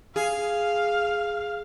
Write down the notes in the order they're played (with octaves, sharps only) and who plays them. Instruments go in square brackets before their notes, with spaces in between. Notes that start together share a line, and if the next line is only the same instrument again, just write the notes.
[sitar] G#4 [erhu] F5